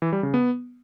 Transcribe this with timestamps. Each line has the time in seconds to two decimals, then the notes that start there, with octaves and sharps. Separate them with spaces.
0.02 E3
0.13 G3
0.23 C#3
0.34 B3